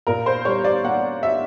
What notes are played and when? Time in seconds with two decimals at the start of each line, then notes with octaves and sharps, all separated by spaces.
0.07 A#2 A#4
0.26 C5
0.45 G3 C#5
0.64 D5
0.84 A#3 F#5
1.23 E5